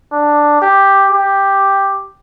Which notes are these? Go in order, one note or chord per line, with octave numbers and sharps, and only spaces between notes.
D4
G4
G4